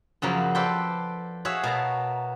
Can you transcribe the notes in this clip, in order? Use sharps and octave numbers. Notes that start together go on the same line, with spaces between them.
F#2 C#3 F3 F#3 A#3
A4 B4 C5 D5 G5
F#4 G#4 C#5 E5 F5
B2 A#4 A5 A#5